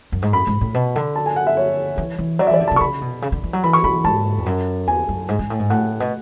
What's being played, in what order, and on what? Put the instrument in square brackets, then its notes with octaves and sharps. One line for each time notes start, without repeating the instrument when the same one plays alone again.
[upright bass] F#2
G#2
[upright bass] F#2 [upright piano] B5
[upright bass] G#2
A2
B2
D3
[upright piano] A5
G#5
F#5
E5
C#5
[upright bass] E3
E3
[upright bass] F#3 [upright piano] D5
[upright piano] E5
[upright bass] E3 [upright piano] D5
[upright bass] D3
[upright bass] C#3 [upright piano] A5
[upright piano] C#6
[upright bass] C#3 [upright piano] B5
[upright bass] B2
C#3
D3
E3
F#3
[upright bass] E3 [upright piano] B5
[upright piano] C#6
[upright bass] E3 [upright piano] B5
[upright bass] G#2 [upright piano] A5
[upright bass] E2
F#2
[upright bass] E2 [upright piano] G#5
[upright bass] F#2
G#2
G#2
A2
G#2
[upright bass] A2 [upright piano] F#5
[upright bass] B2